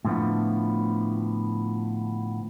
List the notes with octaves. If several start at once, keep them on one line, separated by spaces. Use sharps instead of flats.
A2 D3 F3 B3